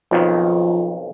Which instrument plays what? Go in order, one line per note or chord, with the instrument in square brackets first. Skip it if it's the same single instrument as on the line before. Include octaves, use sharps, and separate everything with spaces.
[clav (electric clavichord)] B1 F2 D#3 [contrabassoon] F3